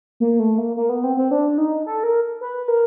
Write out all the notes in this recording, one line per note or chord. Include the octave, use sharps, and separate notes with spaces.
A#3
A3
A#3
A#3
B3
C4
C4
D4
D#4
A4
A#4
B4
A#4